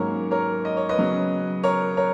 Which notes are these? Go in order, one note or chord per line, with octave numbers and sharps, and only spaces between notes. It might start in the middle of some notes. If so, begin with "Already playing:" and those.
Already playing: G#2 D#3 F#3 A#3 C#4 A#4 C#5
A#4 C#5
D#5
C#5
B4 D#5
C#3 F#3 B3
A#4 C#5
A#4 C#5